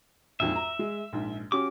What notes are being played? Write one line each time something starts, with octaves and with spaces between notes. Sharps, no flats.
A#1 F2 G#2 E5
A#5
G#3
A#1 G#2
C#4 F#4 G4 D6